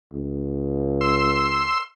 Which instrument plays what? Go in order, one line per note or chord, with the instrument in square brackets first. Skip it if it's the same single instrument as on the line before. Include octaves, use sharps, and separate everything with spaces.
[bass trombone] C#2
[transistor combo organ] C6 E6